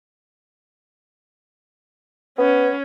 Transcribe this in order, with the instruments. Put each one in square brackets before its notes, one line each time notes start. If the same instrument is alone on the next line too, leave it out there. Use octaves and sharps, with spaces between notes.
[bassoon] B3 [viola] C#4